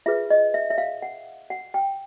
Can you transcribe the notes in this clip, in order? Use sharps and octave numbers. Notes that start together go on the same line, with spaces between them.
F4 G#4 B4 E5
D#5
E5
E5
F5
F#5
F#5
G5